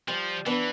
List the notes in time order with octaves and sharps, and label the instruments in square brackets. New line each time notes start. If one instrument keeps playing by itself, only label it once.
[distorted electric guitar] F3 [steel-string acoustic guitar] G3
[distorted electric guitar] E3 [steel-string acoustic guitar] B3 D4